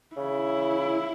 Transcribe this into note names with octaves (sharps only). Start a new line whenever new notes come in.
C#3 E4